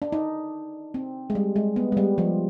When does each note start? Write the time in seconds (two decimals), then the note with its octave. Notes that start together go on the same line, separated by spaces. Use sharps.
0.02 D4
0.12 D#4
0.94 C4
1.30 G#3
1.35 G3
1.56 G#3
1.76 B3
1.92 G#3
1.97 G3
2.18 F3